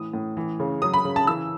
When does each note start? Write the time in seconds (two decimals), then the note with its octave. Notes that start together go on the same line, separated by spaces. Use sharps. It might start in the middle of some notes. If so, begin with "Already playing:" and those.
Already playing: A2 E3 D#6
0.13 A2
0.37 E3
0.60 C#3
0.82 F#3 D#6
0.94 B5
1.05 C#3
1.16 A5
1.27 E3 E6